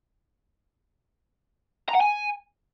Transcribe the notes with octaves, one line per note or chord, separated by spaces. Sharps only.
A#5
F#5
G#5